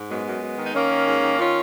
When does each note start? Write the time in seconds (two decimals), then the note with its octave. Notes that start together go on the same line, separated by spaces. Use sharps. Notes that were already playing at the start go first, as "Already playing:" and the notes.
Already playing: G#2
0.09 F#2 G#3 B3
0.26 F#2
0.42 F#2
0.58 D#3 D#4
0.74 D#3 A#3 C#4
0.91 D#3
1.06 G#2
1.23 D#3
1.39 D#3 C#4 F4